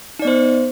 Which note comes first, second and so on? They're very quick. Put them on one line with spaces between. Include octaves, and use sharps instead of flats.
D#4 D5 B3 C5